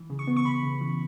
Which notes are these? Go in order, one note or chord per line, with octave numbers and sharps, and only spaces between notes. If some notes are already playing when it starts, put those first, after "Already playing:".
Already playing: E3
C#3
C#6
B3
C#6
C#3 B5
C#3
E3